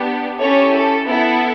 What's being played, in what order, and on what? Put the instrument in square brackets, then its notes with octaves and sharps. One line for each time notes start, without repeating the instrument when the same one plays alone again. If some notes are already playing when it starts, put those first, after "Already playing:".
Already playing: [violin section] B3 D4 G4
C#4 E4 G4 A4 C#5
A4
B3 E4 A4